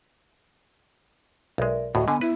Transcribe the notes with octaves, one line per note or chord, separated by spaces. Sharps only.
B1 G#3 A#4 D5 E5
D2 A2 F#4 D#5
D3 B3 G#5
E4 B4